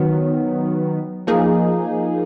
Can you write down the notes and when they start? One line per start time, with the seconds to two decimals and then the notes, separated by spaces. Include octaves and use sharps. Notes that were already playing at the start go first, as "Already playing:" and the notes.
Already playing: D#3 F#3 B3
1.27 F3 A#3 D#4 G#4